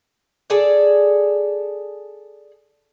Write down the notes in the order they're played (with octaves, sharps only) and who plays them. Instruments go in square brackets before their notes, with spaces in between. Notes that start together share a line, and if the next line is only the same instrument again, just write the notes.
[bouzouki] G#4 A4 D5